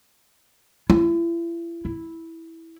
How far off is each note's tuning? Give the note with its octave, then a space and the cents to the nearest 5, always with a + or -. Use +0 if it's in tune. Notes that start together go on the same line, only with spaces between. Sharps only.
E4 +35
E4 -5